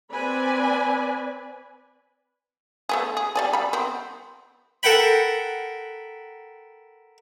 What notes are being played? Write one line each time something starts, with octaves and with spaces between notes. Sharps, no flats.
C4 B4 D5 G#5 B5
A3 B3 G#4
G#4
G3 D5 G#5
G3 B5
B3 C4
A4 A#4 F#5 G5 B5